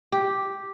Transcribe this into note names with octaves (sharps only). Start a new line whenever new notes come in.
G4